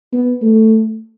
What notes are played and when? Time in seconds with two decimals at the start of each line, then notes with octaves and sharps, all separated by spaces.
0.13 B3
0.42 A3